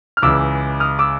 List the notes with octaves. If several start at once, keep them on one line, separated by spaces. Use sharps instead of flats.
F6
C#2 C#3 E3 G#3 D6 E6
D#6 F6
D6 E6